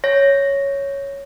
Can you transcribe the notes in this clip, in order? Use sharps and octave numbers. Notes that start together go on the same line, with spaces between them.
C#5 A#6